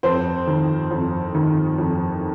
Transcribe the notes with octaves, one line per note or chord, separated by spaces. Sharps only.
F2 C4 C5
D#3
F2
D#3
F2